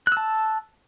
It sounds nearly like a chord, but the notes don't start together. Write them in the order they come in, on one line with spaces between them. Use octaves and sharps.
F#6 E6 A5